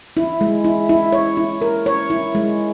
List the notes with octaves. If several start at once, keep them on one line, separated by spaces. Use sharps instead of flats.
E4
G#3
E4
E4
C#5
E4
A#4
C#5
E4
G#3